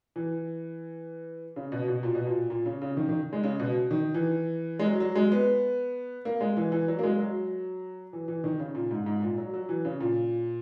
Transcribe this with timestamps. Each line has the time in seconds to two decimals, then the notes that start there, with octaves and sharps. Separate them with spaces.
0.16 E3
1.56 C#3
1.72 B2
1.88 B2
2.03 A#2
2.15 B2
2.27 A#2
2.50 A#2
2.66 C#3
2.82 C#3
2.97 D#3
3.09 D#3
3.33 G#3
3.44 C#3
3.60 B2
3.91 D#3
4.14 E3
4.79 G#3
4.84 F#3
5.00 F#3
5.15 G#3
5.32 B3
6.25 A#3
6.41 G#3
6.57 E3
6.72 E3
6.88 F#3
6.99 A#3
7.03 G#3
7.18 F#3
8.13 E3
8.28 E3
8.44 D#3
8.59 C#3
8.75 A#2
8.91 G#2
9.06 G#2
9.22 A#2
9.38 F#3
9.54 F#3
9.69 E3
9.85 C#3
10.01 A#2